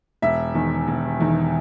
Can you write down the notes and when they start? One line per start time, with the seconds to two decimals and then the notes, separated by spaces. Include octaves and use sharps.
0.22 E1 E5
0.55 E2 D#3
0.87 E1
1.20 E2 D#3